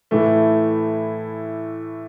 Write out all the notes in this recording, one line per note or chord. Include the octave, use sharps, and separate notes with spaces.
A2 E3 A3